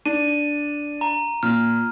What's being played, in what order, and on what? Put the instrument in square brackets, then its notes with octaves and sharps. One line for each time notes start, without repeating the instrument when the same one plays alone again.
[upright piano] D4 [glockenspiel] D#7
[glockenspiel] A#5
[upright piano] A#2 [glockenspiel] F6